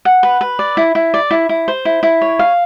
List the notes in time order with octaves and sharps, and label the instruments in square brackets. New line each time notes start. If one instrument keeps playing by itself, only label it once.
[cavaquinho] F#5
B4
B4
D5
E4
E4
D5
E4
E4
C5
E4
E4
C#5
F5